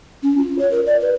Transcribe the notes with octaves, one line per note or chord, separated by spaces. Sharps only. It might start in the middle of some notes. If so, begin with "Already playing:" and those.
C#4
F4
C#5
A#4
D5
B4